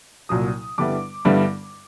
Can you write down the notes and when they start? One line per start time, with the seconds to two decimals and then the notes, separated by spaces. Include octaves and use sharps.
0.29 C2 A#2 F#3 D#6
0.78 G2 D3 G3 B3 E4 D6
1.25 G2 D3 G3 B3 E4